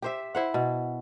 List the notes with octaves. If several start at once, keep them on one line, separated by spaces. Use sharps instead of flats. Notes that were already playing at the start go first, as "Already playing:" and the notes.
G4 C5 E5
E4 C5 F#5
B2